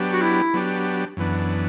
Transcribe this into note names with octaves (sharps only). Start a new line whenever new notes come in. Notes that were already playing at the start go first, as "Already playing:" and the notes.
Already playing: F#3 B3 D4 G4
F#4
E4
F#3 B3 D4 G4
F#2 E3 B3 D4